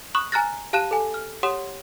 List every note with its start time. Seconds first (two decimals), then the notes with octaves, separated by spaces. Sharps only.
0.15 B5 C#6 D#6 F#6
0.32 G#5 A#5 F6 F#6 A6 A#6
0.73 G4 F5 A5 F#6 D#7 E7
0.91 A4 G#5
1.14 F6
1.43 G4 C#5 F#5 C6 D#6 E7